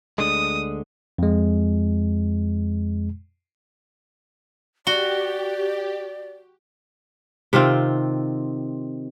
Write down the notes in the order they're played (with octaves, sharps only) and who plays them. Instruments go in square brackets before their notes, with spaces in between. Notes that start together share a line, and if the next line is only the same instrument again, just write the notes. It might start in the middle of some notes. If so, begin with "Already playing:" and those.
[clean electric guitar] D2 D3 G#3 [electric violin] D#6
[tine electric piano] F2 G#3
[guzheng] F#4 [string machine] G4 [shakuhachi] D5 [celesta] G7
[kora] C3 D#3 C4 F4